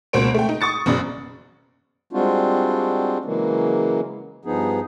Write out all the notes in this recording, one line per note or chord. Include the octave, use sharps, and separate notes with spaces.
C#2 B2 A#3 C5 D7
A3 G5
D#4
C#6 D#6 A6 C#7
F#1 F#2 C#3 D5
G3 G#3 C4 D4 F4 F#4
C#3 E3 F#3 G#3 A#3
G2 F3 B3 D#4 G#4